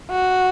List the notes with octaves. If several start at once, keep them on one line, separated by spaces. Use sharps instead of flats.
F#4